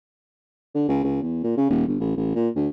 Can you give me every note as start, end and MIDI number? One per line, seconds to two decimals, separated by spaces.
0.74 0.86 50
0.88 1.03 37
1.04 1.20 37
1.22 1.43 40
1.44 1.52 46
1.57 1.69 49
1.70 1.83 27
1.87 1.99 31
2.00 2.13 33
2.16 2.32 33
2.35 2.48 46
2.55 2.68 38